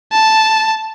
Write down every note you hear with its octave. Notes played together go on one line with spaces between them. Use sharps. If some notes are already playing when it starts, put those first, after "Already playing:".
A5